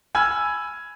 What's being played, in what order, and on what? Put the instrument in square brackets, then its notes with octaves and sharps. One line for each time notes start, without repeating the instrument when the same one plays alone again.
[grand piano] G#5 B5 E6 F6 G#6